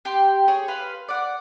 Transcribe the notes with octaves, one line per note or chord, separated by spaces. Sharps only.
G4 G5 C6
G#4 C#5
B4 F5 C6
D5 F#5